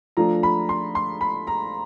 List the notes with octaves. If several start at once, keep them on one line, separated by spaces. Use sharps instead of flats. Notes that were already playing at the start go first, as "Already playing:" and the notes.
F3 A3 D4 F4 A#5
B5
C6
C6
B5
A#5